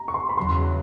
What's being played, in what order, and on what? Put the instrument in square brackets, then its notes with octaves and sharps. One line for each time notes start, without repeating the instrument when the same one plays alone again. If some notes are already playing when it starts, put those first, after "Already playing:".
Already playing: [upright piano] A#5
C#6
C6
B5
[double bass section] E2 C#3 F#3 [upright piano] C6